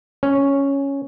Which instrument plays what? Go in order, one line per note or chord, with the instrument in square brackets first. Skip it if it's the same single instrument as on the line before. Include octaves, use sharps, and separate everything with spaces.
[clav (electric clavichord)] C#4